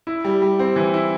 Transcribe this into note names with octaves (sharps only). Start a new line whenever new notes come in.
E4
G3
G3
C4
E3
E4